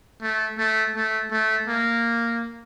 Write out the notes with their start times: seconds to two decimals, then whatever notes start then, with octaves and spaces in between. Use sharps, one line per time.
0.22 A3
0.58 A3
0.96 A3
1.31 A3
1.68 A#3